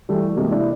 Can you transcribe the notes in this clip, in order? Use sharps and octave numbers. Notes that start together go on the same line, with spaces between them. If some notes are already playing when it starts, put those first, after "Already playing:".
E3 G3 A3
C3 G#3 A#3
D4 E4